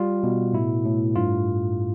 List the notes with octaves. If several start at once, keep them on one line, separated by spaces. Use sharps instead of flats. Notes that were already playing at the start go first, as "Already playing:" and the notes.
Already playing: G3 F4
B2
A2 E4
A2
G2 F4